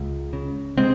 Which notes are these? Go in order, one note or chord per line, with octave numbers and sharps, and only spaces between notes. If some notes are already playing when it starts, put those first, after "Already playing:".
Already playing: C#2
C#3
C3 G#3 C4